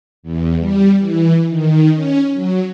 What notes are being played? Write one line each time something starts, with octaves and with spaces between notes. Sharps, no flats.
E2
G3
E3
D#3
C#4
F#3